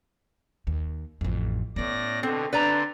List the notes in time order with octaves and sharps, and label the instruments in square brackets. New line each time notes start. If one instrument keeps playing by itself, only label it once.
[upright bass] D#2
A1 F2
[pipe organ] A2 D5 A#6 [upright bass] B3 C#4
[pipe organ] B2 D3 [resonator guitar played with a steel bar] C4 [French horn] A4
[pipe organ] D3 C4 C5 [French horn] D4 [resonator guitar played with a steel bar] B4 D5 A#5